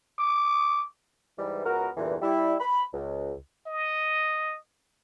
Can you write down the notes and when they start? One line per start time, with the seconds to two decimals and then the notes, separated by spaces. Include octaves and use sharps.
0.18 D6
1.38 G#2 E3 G3
1.65 C#2 B3 F#4 A#4
1.97 E2 G2 A#2 D3 E3
2.22 G3 E4
2.60 B5
2.94 C#2
3.67 D#5